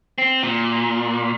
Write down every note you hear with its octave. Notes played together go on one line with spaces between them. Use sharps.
C4
A#2